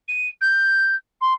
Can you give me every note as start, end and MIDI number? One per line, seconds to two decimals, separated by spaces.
0.08 0.28 99
0.41 0.95 91
1.21 1.33 84